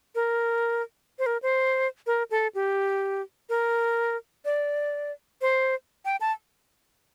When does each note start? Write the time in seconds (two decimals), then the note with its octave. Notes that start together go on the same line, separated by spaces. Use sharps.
0.15 A#4
1.19 C5
1.26 A#4
1.43 C5
2.06 A#4
2.31 A4
2.55 G4
3.49 A#4
4.45 D5
5.41 C5
6.05 G5
6.21 A5